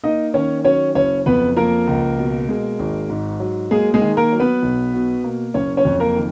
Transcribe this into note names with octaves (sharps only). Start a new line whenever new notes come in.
A#3 D#4 D#5
D#3 C#4 C#5
F#3 C#4 C#5
F#1 C#4 C#5
F2 B3 B4
F3 A#3 A#4
C#2
B2
G#3
G#1
G#2
F#3
G#3 A#3 G#4
G#3 G#4
D#3
A#3 A#4
F#3
B3 B4
B1
B2
A#3
F#1 C#4 C#5
C#4 C#5
F2
A#3 A#4
D#3